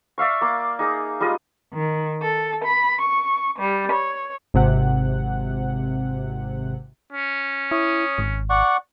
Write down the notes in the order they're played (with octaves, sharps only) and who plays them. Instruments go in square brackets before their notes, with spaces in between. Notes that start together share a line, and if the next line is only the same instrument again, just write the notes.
[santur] D5 E5 F5 C#6
A#3 D6
D#4 G#4 A#5
G3 G#3 F4 D#5
[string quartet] D#3
A4
B5
C#6
G3
C#5
[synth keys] G#1 C3 F#5
[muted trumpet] C#4
[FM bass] E4 [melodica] C#5 D#6
[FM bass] G#1
[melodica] D5 F#5 C#6